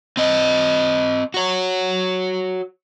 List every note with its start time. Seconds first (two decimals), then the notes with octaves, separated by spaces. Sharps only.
0.17 C4 D#5
1.34 F#4 C#5